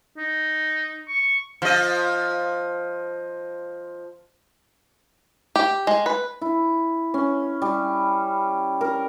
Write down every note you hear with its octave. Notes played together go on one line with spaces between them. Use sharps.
D#4
C#6
F3 D#5
G4
G#3
B4
E4
C#4
G3
A#4